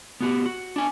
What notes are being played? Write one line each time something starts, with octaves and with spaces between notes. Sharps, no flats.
B3 F#4 G4
F#4
D4 G#5